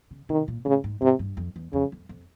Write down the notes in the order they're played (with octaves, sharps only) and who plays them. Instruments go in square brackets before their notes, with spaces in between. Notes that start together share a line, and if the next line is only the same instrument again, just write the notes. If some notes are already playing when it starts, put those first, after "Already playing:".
[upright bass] C#3
[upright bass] C3 [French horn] D#3
[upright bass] A#2
[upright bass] A2 [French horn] C#3
[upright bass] G#2
[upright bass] G#2 [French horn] C3
[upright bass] G2
F2
E2
[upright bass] F2 [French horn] C#3
[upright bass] F2
F2